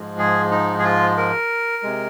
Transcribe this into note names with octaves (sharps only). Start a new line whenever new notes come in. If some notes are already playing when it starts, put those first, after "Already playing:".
Already playing: G#2 F3 G#3
G#4
D#4
G#4
F4
A#4
C3 G#3